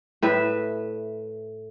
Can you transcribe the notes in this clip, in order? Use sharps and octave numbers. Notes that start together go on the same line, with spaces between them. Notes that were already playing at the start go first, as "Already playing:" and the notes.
A2 B4 E5